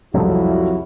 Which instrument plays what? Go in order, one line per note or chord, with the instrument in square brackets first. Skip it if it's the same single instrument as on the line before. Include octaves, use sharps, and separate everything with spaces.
[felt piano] C2 F2 [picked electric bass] F3 F#3 [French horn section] E4 F#4